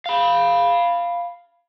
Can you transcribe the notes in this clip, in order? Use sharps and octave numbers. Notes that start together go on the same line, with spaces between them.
F5 B5